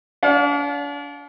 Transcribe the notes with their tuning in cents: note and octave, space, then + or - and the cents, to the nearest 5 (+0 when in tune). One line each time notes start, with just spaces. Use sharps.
D4 -40 F5 +35